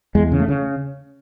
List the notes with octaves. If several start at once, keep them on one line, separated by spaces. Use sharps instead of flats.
E2 G#3
C#3
A3
C#3